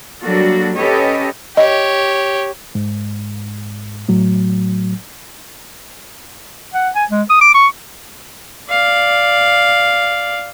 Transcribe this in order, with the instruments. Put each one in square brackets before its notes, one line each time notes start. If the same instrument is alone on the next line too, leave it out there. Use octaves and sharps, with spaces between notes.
[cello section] F#3 G3 A#3 D4 F#4 A4
C#4 G4 A4 B4 C#5 D#5
[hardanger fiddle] G4 C#5 [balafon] D#5
[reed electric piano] G#2
A2 F#3
[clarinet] F#5
G#5
G#3
D#6
D6
C#6
[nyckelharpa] D5 F5